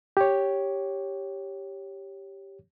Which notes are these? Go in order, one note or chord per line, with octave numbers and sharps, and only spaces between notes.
G4 C#5